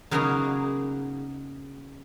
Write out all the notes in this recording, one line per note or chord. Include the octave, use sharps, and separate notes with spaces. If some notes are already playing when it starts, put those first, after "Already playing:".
C#3 F#3 A#3 B3 D#4 G#4